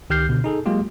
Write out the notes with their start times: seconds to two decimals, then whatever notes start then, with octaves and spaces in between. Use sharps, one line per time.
0.10 C#2 D#3 G4 F6 G6 C7
0.29 B2 D3
0.44 D#4 G#4 A4
0.66 F#3 G#3 A#3 F4 G4